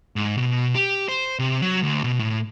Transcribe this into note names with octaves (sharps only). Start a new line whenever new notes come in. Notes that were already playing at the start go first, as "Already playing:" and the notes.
G#2
B2
G4
C5
C3
F#3
D2
B2
A2